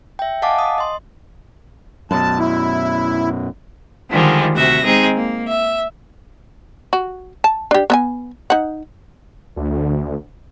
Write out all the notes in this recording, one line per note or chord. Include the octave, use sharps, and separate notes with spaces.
E5 G5
D#5 F5 F#5 G#5 A5 D6
D#6
D#5 C6
F#2 B2 A5
E4
D3 D#3 F3 G3 G#3
D2 C3 F#4 E5 A#6
G#3 C4 D#4 G#4
A#3
E5
F#4
A5
D4 G4
B3 E5 G#5
D#4 F#5
D2